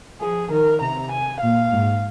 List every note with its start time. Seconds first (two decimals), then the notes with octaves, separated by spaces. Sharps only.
0.20 F3 G#4
0.51 D#3 A#4
0.81 C3 A#5
1.12 G#5
1.41 A#2 F5
1.72 G#2